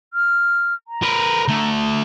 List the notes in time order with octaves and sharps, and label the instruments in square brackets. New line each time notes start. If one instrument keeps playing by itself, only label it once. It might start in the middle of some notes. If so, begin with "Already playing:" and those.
[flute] F6
A#5
[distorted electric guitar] A#4 B4
D3 A3